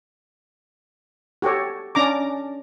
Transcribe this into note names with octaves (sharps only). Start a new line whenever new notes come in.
F#4 G4 A4 C#5
C#4 D4 A#5 D6